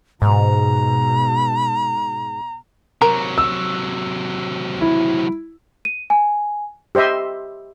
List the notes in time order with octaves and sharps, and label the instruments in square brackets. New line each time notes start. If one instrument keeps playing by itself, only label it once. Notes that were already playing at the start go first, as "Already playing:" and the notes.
[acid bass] G#2 [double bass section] B2 [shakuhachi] A#5
[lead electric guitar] C3 F#3 [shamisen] A#4
[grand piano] E6
E4
[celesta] D#7
G#5
[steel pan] G4 C5 D#5 E5 C6